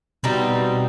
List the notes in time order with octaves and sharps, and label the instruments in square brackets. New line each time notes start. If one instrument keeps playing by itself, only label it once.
[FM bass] B2 [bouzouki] G3 C4 D#4